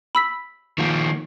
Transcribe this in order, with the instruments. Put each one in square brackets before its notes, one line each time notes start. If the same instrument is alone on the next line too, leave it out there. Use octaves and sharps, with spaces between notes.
[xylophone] B5 E6 B6
[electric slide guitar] D#3 F3 A#3